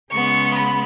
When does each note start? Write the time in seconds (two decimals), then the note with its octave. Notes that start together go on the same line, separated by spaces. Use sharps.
0.10 C#3 G#3 B3 C#6
0.53 B5